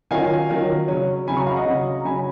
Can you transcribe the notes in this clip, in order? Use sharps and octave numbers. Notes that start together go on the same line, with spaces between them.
D#3 F#3 C#4 F4 F5 G#5
D#3 F#3 C#4 F4
C#3 F#3 C#4
C#3 F#3 C#4 G#5 B5
A#5 C#6
F5
D#5 F#5
C#3 F#3 C#4
A#5
C#3 F#3 C#4 G#5 B5